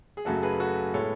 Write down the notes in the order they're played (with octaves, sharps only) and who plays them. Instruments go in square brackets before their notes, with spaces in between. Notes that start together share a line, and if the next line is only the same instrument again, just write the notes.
[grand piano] G#4
F#2 C#3 F#3 A3 F#4 A4
G#4 B4
F#4 A4
A2 G#3 B3 A4 C#5